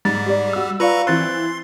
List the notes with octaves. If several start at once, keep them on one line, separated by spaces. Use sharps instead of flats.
G#2 G3 A6
G4 D5
F#4 E6
F4 B4 D5 F5 A#5 C#6
E3 C4 C6 F#6 A6